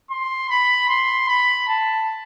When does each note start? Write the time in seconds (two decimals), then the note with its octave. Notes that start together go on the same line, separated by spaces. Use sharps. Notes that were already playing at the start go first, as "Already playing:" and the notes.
0.10 C6
0.50 B5
0.89 C6
1.28 B5
1.67 A5